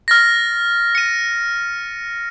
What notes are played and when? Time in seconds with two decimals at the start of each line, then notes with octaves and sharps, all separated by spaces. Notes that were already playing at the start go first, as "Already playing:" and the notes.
0.08 F6 A6 A#6
0.95 C#7 D#7